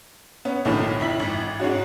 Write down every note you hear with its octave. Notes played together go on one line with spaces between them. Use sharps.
B3 C#4
B1 A2 D3 D#3 F3 F#3
F2 E4 B6 F#7
G#1 E3
G#2 G#3 C#4 F#4